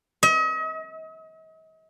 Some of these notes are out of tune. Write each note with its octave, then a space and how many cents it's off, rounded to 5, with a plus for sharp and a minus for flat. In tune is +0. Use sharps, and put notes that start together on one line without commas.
D#5 +40